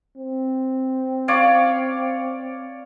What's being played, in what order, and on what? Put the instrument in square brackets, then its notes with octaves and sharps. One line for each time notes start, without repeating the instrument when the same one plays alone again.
[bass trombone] C4
[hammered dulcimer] C#5 D5 F5